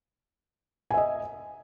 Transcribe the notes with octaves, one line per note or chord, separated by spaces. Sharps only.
D#5 E5 G#5